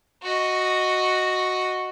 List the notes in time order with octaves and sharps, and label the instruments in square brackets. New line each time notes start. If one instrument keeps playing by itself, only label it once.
[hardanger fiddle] F#4 D#5